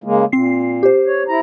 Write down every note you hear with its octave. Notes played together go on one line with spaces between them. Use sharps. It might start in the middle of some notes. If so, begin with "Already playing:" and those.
C#3 G#3 A#3
A#2 C4 C7
G4 C5
C#5
E4 A#5